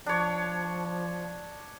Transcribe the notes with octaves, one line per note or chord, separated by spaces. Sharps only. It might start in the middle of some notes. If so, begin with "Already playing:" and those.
F3 D4 C#5